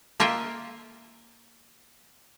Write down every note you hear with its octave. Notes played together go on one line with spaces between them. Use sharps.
A#3 F4 D#5 E5 G5